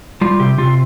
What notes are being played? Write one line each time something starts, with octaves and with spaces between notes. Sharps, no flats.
G3 F4
C3 G4
C3 F4